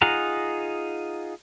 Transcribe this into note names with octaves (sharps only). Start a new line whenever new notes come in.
D#4 F4 G#4 F#5 A#5